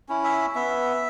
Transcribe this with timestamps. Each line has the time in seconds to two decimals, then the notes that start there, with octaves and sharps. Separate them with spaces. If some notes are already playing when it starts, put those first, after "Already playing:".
0.09 C#4 E4
0.24 E5
0.55 B3 E5